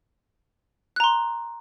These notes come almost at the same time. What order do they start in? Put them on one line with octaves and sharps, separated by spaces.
F#6 A#5 C6